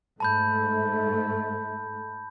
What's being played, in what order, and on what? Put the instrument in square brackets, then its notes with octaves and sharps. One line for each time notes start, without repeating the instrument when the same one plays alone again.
[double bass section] G#2 A3 [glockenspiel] A5 B5 G6